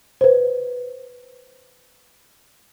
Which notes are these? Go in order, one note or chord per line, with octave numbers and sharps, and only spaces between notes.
B4 C5